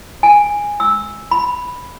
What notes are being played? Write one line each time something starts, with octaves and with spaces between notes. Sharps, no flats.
G#5
E6
B5